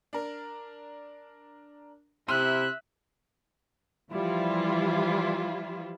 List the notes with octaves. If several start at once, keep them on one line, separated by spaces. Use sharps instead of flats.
D4 A#4
C3 E4 E5 C6 F6 F#6 D#7
E3 F3 G3 E4 F4